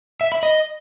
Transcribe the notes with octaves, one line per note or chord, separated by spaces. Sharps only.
E5
B5
D#5